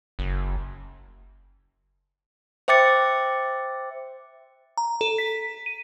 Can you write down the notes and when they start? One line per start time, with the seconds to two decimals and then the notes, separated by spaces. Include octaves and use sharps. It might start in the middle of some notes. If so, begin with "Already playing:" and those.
0.19 F#1
2.68 C5 E5 G5 D6 A6 C#7
4.78 A#5
5.01 A4
5.18 B6
5.66 D#7